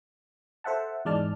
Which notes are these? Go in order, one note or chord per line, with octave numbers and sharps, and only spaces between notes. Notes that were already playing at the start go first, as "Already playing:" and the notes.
A4 C5 E5 F#5 A5
E2 G#2 G#3 D5 A5 F6